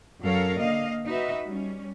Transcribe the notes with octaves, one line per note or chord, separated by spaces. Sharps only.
F#2 F#3 A4 A#4 C#5 F5
D3 A#3 D#5 F5
D#4 F#4 B4 E5
G3 C#4